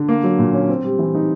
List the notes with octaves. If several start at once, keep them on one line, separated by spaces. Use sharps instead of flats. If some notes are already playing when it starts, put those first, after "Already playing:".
Already playing: D3
A#3
F#3
A#2
C#4
C4
G3
E3
D#4